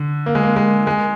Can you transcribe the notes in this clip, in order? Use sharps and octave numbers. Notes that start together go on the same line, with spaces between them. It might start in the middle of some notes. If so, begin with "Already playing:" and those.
Already playing: D3
A#3
G#3
A#3
G#3
G#3